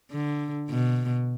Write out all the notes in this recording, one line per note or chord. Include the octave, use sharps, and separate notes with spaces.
D3
B2